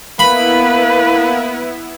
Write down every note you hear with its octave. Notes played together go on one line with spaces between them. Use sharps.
A#3 B3 E4 B4 B5